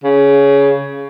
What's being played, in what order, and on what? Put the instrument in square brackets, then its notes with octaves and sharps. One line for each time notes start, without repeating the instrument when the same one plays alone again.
[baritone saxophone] C#3